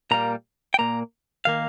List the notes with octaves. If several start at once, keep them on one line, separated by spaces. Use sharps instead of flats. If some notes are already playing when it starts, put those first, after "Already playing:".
A#2 G3 A#3 A#5
G5
A#2 A#3 A#5
D#3 A#3 F5